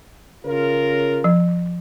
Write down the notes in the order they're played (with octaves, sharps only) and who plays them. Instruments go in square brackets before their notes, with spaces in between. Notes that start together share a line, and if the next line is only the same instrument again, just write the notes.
[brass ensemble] C#3 F4 A#4
[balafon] F3